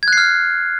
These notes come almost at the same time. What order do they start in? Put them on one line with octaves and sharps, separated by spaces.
G#6 F#6 C7 F6